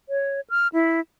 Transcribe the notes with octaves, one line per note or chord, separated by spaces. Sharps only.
C#5
F6
E4